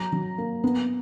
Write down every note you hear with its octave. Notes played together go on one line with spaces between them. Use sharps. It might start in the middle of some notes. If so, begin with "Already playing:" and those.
Already playing: F#3 A#5
F#3
A#3
B3